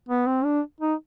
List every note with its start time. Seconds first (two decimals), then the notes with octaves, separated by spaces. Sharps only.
0.09 B3
0.27 C4
0.44 D4
0.81 D#4